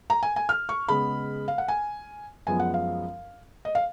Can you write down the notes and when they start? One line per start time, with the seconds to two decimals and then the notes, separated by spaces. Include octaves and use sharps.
0.10 A#5
0.23 G#5
0.36 G#5
0.49 F6
0.69 C#6
0.88 C#3 G#3 B3 B5
1.48 F5
1.58 F#5
1.68 G#5
2.47 F#2 F3 G#3 B3 G#5
2.60 F#5
2.74 F5
3.65 D#5
3.75 F5